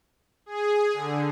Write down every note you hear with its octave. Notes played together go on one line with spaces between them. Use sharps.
G#4
D3